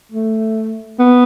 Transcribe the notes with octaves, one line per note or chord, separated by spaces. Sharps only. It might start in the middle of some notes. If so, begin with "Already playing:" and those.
A3
B3